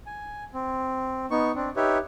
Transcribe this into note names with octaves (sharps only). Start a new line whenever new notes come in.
G#5
C4
B3 D#4 C#6
C4 D4
D#4 G4 B4 C#5 E5